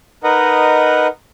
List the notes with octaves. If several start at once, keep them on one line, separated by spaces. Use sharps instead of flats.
D#4 A#4 B4 D#5 F#5